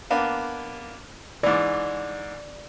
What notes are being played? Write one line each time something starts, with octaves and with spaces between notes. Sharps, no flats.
A#3 B3 D4
G#2 E3 D5